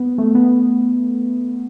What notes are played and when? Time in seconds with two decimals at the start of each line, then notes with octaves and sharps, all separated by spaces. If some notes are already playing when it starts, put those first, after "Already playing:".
Already playing: B3
0.18 A3
0.35 B3